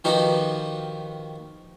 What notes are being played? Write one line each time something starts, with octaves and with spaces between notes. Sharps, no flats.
D#3 F3 D#4 F#4 G4 B4